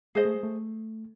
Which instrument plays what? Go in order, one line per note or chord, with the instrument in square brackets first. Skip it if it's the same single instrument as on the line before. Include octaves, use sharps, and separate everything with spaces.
[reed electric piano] G#3 [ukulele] G#4 C5 D#5
[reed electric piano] A3
G#3
A3